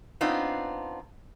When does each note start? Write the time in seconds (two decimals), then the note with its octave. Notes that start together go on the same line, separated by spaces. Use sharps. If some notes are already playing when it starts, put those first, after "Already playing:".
0.21 B3 C4 D4 D#4 F4